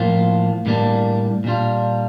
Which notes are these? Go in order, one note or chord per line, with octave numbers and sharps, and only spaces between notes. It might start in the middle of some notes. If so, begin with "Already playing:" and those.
Already playing: A2 F3 A#3 F4
A2 G3 A#3 D4
A#2 G3 D4 F4